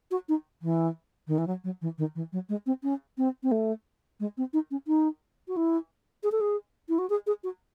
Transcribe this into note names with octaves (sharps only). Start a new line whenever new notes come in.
F#4
D#4
E3
D#3
E3
F#3
F#3
E3
D#3
E3
F#3
G#3
C4
C#4
C4
C4
A3
G#3
C4
D#4
C#4
D#4
F#4
E4
G#4
A4
G#4
E4
F#4
G#4
G#4
F#4